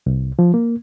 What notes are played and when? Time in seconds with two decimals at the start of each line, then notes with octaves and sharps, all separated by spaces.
0.06 C2
0.39 F3
0.54 A#3